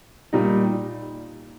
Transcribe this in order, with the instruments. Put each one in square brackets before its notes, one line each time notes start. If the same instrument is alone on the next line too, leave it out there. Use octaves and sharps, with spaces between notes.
[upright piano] A#2 G3 D#4